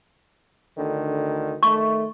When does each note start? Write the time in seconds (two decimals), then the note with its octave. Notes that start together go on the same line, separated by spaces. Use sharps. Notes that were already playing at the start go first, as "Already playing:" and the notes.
0.78 D2 D3 D#3
1.63 D#3 A3 C#6